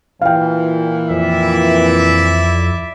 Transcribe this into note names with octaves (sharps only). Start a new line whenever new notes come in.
A#2 E3 F5 G5
F2 E4 D5 E5